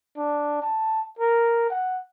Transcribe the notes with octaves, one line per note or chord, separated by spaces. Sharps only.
D4
A5
A#4
F#5